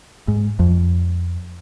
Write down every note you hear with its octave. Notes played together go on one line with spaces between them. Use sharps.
G#2
F2